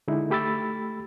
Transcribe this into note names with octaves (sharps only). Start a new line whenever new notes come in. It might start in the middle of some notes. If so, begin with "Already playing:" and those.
D3 G#3 D#4 E4
A3 G4 B5 E6 A6